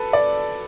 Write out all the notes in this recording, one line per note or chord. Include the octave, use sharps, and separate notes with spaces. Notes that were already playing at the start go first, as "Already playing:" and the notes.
Already playing: A4 B4
D5